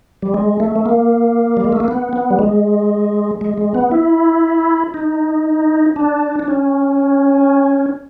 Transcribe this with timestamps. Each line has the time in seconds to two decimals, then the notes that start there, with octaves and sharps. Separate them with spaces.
0.22 G3
0.34 G#3
0.60 A3
0.76 A3
0.86 A#3
1.57 G3
1.64 G#3
1.72 A3
1.80 A#3
1.88 B3
2.13 B3
2.30 G3
2.39 G#3
3.41 G#3
3.58 G#3
3.74 B3
3.91 E4
4.94 D#4
5.96 D4
6.39 D4
6.48 C#4